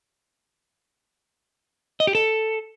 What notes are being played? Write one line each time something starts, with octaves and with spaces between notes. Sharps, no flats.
D#5
G4
A4